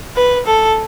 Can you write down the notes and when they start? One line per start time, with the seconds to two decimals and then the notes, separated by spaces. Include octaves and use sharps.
0.16 B4
0.46 A4